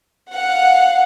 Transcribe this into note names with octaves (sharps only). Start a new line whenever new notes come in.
F5 F#5